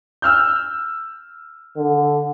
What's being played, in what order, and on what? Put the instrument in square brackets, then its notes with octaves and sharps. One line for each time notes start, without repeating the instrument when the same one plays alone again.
[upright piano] E6 F6 G6
[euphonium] D3